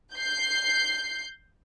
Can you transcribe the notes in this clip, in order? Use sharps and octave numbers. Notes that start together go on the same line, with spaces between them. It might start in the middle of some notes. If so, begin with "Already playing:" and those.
G6 C7